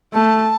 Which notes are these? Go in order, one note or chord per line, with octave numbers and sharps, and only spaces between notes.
A3 A5